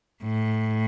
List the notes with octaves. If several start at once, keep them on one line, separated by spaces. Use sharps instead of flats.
A2